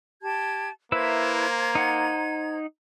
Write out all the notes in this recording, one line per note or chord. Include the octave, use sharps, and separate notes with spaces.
G4 A5 G#6
A#3 E4 B4 C5 E5 A#5 G#6
D#4 F#5